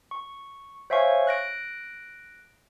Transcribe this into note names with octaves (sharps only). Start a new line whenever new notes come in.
C#6
C5 C#5 E5 F5 G#5 C#6
F#6 A#6 D7